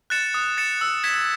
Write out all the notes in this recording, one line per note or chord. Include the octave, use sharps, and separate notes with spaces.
F#6 A6 C#7 E7
D#6
A6 C#7 E7
E6
G#6 B6 E7